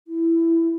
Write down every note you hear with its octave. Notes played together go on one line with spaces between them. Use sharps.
E4